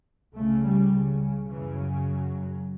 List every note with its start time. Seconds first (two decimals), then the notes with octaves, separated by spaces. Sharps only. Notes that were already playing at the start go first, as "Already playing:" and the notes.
0.35 C#2 C#3 A3
0.63 G3
0.92 C#3
1.50 F#2 C#3 E3
1.78 F#3